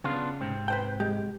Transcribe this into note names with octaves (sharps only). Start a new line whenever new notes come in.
C#3 B3 D4 F4
G#2 C3 C4
B4 C5 G5
G#3 G4